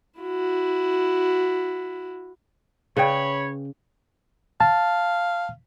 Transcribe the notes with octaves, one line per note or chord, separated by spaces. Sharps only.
E4 F#4
C#3 B4 C#5 D5 G5 B5
F5 A5